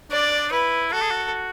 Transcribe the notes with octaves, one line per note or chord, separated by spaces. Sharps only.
D4 D5
D4
E4 B4
F#4 A4
G#4
F#4